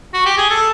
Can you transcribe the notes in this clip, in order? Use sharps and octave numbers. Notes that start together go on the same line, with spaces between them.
F#4
G4
G#4
A4